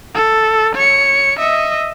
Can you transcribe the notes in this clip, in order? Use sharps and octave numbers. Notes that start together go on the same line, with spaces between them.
A4
C#5 C#7
D#5 E5